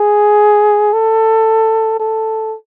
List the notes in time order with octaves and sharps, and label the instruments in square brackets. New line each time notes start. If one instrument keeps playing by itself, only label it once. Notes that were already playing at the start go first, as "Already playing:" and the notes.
Already playing: [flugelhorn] G#4
A4
A4